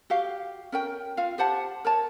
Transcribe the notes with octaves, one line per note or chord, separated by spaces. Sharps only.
F#4 G4 F5
C#4 A#4 G5
F4 F5
G4 C5 F#5 A5
A#4 C#5 A5